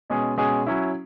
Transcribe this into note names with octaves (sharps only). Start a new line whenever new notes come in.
B2 G#3 C#4 G#4
B2 G#3 C#4 G#4
F#3 C#4 E4